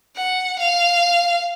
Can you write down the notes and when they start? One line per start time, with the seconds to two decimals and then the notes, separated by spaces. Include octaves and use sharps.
0.16 F#5
0.59 F5